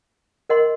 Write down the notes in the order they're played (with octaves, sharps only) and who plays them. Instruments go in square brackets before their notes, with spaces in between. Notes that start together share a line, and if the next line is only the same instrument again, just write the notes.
[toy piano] A#4 D#5 F#5 C6